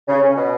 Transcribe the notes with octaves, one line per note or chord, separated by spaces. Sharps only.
C#3
C#4
B2